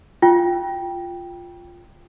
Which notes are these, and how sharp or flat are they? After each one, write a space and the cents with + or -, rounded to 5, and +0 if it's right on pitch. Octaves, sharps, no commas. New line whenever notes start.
F4 +0 G5 +0